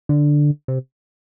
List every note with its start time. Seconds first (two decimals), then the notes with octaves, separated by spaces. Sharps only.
0.09 D3
0.68 C3